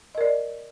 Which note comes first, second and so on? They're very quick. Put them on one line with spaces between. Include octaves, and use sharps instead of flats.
D#5 A#4 D5